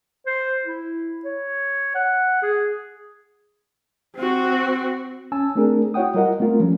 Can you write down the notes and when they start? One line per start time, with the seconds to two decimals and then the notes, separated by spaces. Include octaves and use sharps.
0.26 C5
0.64 E4
1.25 C#5
1.95 F#5
2.43 G#4
4.16 C4 F#4
5.32 C#4 G#5 A5 E6
5.55 A3 C4 D4 G#4 A#4
5.94 E4 F#4 C#5 F#5 G5 D#6
6.14 G3 F4 A#4 D#5 F#5
6.40 A3 B3 C4 F4 A#4
6.60 F3 G3 C#4